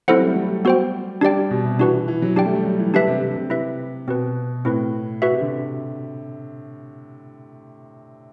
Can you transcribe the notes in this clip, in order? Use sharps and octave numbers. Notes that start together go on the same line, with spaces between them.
F#3 C4 E4 A4 C5 F#5
G3
A3
G3
B3 F#4 C5 G5
G3 D4 G4 D5 G5
B2
C3
E3 D4 F#4 B4
E3
E3
F#3
G3 D4 G4 D5 G5
A3
G3
F#3
E3
D3 D4 G4 B4 E5 A5
C3
C3
C3
E4 B4 E5
B2 C4 F#4 B4
A2 C4 E4 B4
F#4 B4 E5
C3
D3